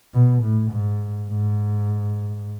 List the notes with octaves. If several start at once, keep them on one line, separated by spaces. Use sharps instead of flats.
B2
A2
G#2
G#2